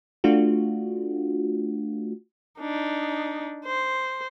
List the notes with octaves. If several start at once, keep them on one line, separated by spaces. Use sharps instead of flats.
A3 D4 F4 F#4
D4 D#4
C5